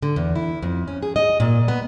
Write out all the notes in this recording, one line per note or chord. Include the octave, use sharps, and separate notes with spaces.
D3
E2
E4
F2
C#4
G#4
D#5
A#2
B3